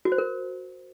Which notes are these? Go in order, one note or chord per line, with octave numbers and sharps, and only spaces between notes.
F#4
C5
A#4